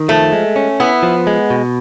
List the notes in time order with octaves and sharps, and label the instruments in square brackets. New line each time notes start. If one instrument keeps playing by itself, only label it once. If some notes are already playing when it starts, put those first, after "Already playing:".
Already playing: [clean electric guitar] D#3
[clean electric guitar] F3 [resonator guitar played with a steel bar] A3
[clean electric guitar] G#3
C#4
[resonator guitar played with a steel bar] B3 [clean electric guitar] E4
[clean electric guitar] F3
G#3
B2